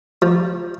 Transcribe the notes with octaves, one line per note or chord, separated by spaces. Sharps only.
F3